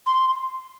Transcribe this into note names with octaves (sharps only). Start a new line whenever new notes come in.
C6